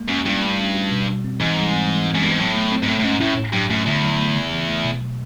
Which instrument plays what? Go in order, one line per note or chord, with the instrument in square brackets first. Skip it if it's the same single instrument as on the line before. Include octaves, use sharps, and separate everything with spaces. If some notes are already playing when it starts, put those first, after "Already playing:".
Already playing: [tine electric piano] G#3 A#3
[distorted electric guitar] F#2 [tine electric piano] C#4
[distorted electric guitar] G2 [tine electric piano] E4
[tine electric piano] A3
C#4
F#4
B2
G3
C4
[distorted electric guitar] G#2 [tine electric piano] E3
[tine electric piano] G3
C4
E3
G#3
[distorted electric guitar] F#2
[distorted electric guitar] G2 [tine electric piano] B3
[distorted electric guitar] G#2
[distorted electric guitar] A2 [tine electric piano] F#3
[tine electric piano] A3
C4
[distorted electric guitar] G#2
[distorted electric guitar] A2 [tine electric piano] A3
[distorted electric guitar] A2
[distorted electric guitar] G#2 [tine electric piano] C#4
[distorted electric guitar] A2 [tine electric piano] E4
[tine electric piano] A2
[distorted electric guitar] G2 [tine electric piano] F#3
[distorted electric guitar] F#2 [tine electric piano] A3
[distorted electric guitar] E2 [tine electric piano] D3
[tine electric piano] F#3
A3
C#3
E3
A3
B2
F#3